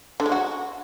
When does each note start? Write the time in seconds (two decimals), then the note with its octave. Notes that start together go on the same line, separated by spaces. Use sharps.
0.20 D3
0.26 G#3
0.32 F#4